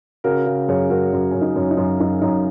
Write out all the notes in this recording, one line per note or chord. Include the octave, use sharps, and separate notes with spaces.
C#3 F#4 A#4
C#3
F#2 G#4 C#5
F#2 F#4 A#4
F#2
F#2 C#4
D#4
F#2
D#4
F#2
F#2 D#4
F#2 D#4